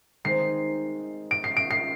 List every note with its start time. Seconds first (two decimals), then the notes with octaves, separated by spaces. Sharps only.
0.24 D#3 G#3 C4 D#4 C7
1.31 D7
1.44 C7
1.57 D7
1.71 C7